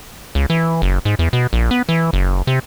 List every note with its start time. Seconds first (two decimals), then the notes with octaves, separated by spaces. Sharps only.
0.35 C#2
0.50 E3
0.82 F#1
1.05 G#2
1.19 E2
1.33 B2
1.53 A#1
1.71 B3
1.89 E3
2.13 F#1
2.47 C3